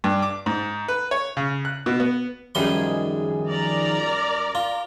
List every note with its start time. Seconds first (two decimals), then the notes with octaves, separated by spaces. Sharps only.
0.04 G2
0.22 D6
0.46 G#2
0.88 B4
1.11 C#5
1.37 C#3
1.65 F#6
1.86 B2
2.00 B3
2.55 F#2 D#3 F3 G3 G#4 C6
3.47 A#4 D5 A#5
4.55 F4